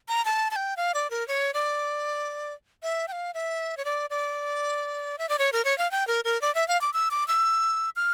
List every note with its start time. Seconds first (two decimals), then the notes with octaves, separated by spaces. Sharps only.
0.08 A#5
0.25 A5
0.51 A5
0.56 G5
0.77 F5
0.94 D5
1.10 A#4
1.28 C#5
1.54 D5
2.83 E5
3.08 G5
3.12 F5
3.34 E5
3.77 C#5
3.85 D5
4.10 D5
5.19 E5
5.29 D5
5.39 C#5
5.53 A#4
5.65 C#5
5.78 F5
5.91 G5
6.07 A#4
6.25 A#4
6.42 D5
6.55 E5
6.68 F5
6.81 D6
6.93 E6
7.11 D6
7.28 E6
7.96 F6